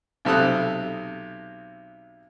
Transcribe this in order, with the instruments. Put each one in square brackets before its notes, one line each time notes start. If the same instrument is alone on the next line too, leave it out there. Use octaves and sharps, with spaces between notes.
[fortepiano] B1 C3 A4 D#6 F#6